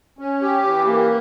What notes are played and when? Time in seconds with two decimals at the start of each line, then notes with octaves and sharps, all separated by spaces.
0.19 C#4
0.42 G4
0.64 E3
0.86 A#3